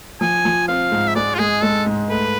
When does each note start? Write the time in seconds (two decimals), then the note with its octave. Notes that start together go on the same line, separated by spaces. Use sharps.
0.21 F3 G#5
0.45 F3
0.68 C4 F5
0.92 G#2
1.07 E5
1.15 G#3 D5
1.34 F4
1.39 G#3 G#4
1.62 G#3 A4
1.86 G#2
2.10 A3 B4